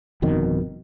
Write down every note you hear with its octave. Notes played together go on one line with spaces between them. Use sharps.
G1 F2 B2 D#3